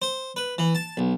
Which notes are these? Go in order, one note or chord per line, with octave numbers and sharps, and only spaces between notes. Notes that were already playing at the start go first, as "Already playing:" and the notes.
C5
B4
E3
A5
B1